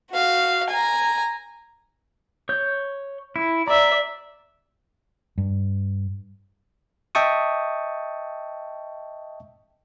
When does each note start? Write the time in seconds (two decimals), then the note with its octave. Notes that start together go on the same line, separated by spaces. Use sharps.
0.11 F#4 F5
0.70 G#5 A#5
2.49 C#5 G6
3.36 E4
3.68 D5 E5 A#5
5.38 G2
7.15 D#5 E5 G5 A5 C#6 D#6